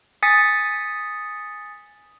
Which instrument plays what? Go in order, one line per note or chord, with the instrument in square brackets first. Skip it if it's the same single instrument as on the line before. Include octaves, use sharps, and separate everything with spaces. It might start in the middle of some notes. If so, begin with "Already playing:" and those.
[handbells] G#5 D#6 A6 B6 C#7